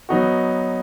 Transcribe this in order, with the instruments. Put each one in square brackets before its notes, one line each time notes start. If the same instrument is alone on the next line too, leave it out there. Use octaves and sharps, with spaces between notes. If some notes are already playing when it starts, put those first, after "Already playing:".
[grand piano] F#3 B3 D#4 F#4